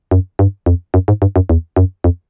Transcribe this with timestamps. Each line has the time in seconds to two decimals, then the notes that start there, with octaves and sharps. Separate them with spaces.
0.11 F#2
0.39 G2
0.66 F2
0.94 F#2
1.08 G#2
1.22 G2
1.36 F#2
1.49 E2
1.76 F#2
2.04 F2